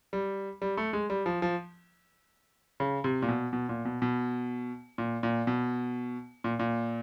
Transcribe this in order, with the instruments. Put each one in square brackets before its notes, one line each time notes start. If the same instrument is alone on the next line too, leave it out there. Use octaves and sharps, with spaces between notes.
[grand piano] G3
G3
A3
G#3
G3
F3
F3
C#3
C3
A#2
B2
B2
A#2
B2
B2
A#2
A#2
B2
A#2
A#2